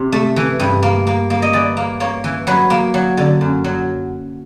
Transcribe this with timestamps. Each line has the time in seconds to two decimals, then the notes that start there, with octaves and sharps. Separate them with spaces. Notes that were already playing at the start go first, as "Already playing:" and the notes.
Already playing: C3
0.12 A3
0.36 E3
0.60 G2
0.82 A#3
1.07 A#3
1.30 A#3
1.42 D#5
1.53 E3 D5
1.77 A#3
2.00 A#3 C#5
2.24 E3
2.47 F#3 B4
2.70 A#3
2.94 F#3
3.17 D3
3.41 F#2
3.64 F#3